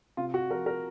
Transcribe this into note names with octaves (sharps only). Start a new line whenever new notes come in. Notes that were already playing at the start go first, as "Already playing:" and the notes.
C3 F4
F#4
F3 A#4
A#4